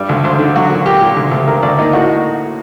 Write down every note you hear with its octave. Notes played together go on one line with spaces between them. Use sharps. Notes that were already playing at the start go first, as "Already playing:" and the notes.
Already playing: G2 G3
D2
D2 C5
D3
F#3 F#4
A#2
A#2 G4
A#2
D2
D2
D2 A#4
D2 D5
A#3 D#4
A2 F#4